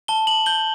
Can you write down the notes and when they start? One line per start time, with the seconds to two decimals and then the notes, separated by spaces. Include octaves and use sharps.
0.08 A5 G7
0.27 F#7
0.46 G6 G7